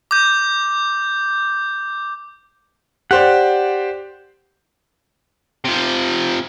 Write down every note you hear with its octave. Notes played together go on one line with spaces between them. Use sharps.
D6 G6
G4 C5 D5 F#5
C3 F3